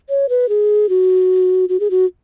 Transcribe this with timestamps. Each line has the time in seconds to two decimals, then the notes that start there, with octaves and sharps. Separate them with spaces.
0.09 C#5
0.29 B4
0.49 G#4
0.89 F#4
1.69 F#4
1.80 G#4
1.91 F#4